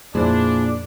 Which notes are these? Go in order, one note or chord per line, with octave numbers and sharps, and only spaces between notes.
F2 A#2 D4 E4 G#4 C5